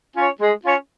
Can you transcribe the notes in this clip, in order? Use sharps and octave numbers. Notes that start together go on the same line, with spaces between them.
C#4 F4 C#5
G#3
C#4 F4 C#5